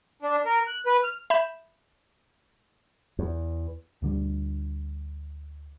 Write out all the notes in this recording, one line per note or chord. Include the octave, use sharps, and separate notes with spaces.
D4
A#4
F#6
B4
F6
E5 B5 G6 E7
E2
D2 D3 G3